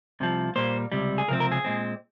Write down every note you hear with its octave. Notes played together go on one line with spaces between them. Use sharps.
C2 C3 F3
A#2 G3 A#3 C5
C#2 C3 G3
G#4
C#2 C3 F3 C4 A#4
A#4
G#4
A#2 G#3 C4